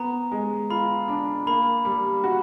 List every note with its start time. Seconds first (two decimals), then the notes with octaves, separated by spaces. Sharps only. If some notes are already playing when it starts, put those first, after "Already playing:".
Already playing: B3 A#5
0.32 G#3
0.70 F4 B5
1.08 D4
1.47 A#3 B5
1.85 G3
2.24 F#4